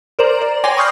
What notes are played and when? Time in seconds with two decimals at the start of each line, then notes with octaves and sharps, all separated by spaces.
0.19 A#4 C5 D5 A#5
0.42 D5
0.64 C#5 G5 G#5 C6 D6 A#6
0.77 B5 C#6 D#6 F6 G6 C7